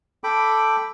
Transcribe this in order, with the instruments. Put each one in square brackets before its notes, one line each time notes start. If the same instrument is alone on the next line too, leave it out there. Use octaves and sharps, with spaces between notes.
[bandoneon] A4 G5 B5 D6